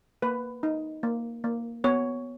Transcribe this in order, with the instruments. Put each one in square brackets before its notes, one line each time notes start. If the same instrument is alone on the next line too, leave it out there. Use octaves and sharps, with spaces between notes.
[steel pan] A#3 B4
D#4
A#3
A#3
B3 C#5